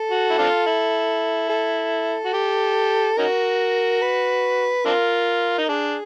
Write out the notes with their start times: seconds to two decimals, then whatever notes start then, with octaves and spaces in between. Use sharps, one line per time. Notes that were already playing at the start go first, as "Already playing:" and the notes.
Already playing: A4
0.11 F#4
0.30 E4
0.38 C4 D4 F4
0.66 E4
1.50 A4
2.25 F#4
2.33 G4
3.18 C#4 D#4 F#4 A#4
4.02 B4
4.85 C4 D4 F4 A#4
5.58 D#4
5.69 D4 G#4